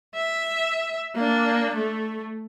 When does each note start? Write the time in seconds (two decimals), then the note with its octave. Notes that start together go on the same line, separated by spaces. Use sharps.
0.15 E5
1.15 A#3 D4
1.74 A3